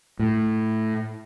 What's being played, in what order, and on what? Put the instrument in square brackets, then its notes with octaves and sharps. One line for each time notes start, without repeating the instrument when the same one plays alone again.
[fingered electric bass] A2